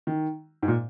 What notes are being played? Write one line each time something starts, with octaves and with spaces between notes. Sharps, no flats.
D#3
G#2
A#2